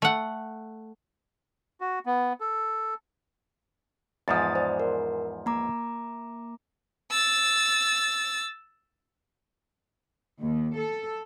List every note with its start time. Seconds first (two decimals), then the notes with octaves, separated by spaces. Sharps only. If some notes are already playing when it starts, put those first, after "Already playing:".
0.02 A3 F#5
1.81 F#4
2.06 B3
2.40 A4
4.28 E2 G#2 F3 D#6 A6
4.55 C5 D5
4.80 A#4
5.46 A#3 A#5 D6
7.11 E6 A6
10.41 D#2
10.77 A4